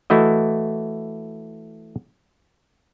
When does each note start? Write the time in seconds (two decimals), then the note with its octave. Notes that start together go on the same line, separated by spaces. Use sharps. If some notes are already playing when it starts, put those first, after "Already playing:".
0.10 E3 A3 E4 F#4 D#5